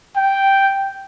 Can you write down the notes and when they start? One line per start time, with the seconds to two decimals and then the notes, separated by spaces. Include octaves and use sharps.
0.17 G5